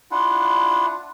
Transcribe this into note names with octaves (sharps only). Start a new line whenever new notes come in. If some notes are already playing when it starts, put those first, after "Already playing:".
D4 E4 F4 F#5